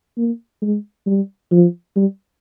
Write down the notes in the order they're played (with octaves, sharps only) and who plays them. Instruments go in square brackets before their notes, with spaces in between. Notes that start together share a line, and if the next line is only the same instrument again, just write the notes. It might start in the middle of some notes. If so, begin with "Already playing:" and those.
[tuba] A#3
G#3
G3
F3
G3